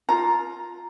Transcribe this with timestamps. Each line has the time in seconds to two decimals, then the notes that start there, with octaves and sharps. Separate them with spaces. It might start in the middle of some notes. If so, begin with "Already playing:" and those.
0.09 F4 A#5